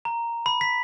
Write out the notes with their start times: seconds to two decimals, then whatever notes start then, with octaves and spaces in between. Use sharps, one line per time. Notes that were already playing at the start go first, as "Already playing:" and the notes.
0.05 A#5
0.46 B5
0.61 B6